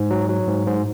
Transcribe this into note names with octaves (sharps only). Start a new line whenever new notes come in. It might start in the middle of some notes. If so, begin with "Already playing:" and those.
Already playing: G#2
F#3
F#3
G#2
G#2